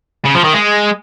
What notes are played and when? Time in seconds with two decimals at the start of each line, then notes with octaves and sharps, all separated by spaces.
0.25 C#3
0.34 F3
0.44 D#3
0.53 G#3